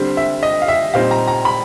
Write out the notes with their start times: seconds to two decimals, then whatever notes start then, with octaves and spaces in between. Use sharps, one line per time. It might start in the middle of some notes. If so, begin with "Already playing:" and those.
Already playing: D3 G3 C4
0.17 E5
0.43 D#5
0.62 F5
0.68 E5
0.94 A#2 G3 C4 D#4 F5
1.11 A#5
1.28 A#5
1.45 B5